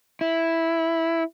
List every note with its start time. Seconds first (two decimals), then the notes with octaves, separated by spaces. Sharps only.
0.21 E4